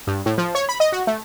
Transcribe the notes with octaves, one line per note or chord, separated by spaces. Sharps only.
G2
A2
F3
C#5
B5
D#5
F#4
A3